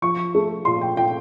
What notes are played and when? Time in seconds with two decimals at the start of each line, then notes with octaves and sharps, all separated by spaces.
0.02 F3 C#6
0.35 A3
0.65 A#2 C6
0.81 G5
0.97 A#2 G5